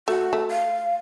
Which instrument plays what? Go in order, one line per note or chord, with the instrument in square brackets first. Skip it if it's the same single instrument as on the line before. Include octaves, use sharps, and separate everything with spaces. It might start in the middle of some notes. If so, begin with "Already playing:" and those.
[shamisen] A3 [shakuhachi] F#4
[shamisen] A3
[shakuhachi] F5